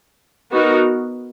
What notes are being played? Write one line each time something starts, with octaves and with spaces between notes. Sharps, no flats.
B3 D#4 F#4 A#4